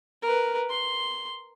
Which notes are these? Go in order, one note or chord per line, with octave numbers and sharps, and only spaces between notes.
A#4 B4
C6